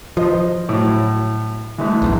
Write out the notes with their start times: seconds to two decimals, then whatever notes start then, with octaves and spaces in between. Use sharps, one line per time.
0.17 F3 C5 D#5
0.69 A2 F#3
1.78 E3 G#3 A3
2.02 B1 E2 G#2